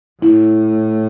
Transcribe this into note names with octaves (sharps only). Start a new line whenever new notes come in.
A2 E4